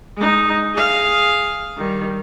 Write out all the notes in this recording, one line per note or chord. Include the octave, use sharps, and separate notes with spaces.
G#3 D#4
G#4 F5
D#3 G3